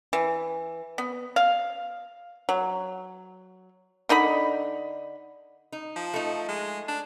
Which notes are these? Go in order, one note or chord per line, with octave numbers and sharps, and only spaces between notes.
E3
B3
F5
F#3
D3 D#4 D#5 B5
D#4
F3
A3 D#4
G#3
D4